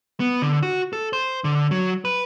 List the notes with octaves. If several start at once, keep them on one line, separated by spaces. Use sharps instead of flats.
B3
D3
F#4
A4
C5
D3
F#3
B4